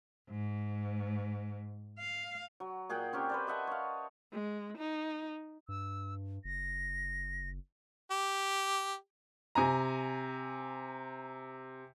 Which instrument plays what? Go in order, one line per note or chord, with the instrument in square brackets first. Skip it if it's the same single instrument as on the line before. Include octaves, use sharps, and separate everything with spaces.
[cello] G#2
F5
[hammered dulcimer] F#3
A#2 G#4 F#5 G5
C4 C#4 G4 A#4
B4 C5 D5
D#5 E5 F#5 A5
C#5 F5
[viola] G#3
D#4
[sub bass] G2 [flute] E6
[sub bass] F#1 [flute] A#6
[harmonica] G4
[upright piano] C3 G#5 A#5